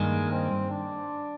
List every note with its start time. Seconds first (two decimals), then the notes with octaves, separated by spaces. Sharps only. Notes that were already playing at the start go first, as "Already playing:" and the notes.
Already playing: G2 D#3 G#3 A#3
0.32 C4
0.71 D4